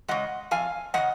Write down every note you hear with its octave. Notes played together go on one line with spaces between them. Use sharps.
C#3 G#3 D#5 F#5
F2 F5 G#5
C#3 G#3 D#5 F#5